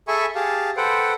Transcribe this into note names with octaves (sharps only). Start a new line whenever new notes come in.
G#4 A4 E5 G#5 B5 C#6
G4 G#4 F5 A5
A4 B4 C5 F#5 G5